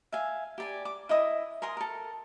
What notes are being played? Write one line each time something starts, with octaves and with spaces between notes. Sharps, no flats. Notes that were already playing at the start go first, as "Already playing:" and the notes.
E5 F5 G#5
G4 D5 G#5
D6
E4 D#5 E5 D#6
A#4 G#5 C6 D#6
A4 A#4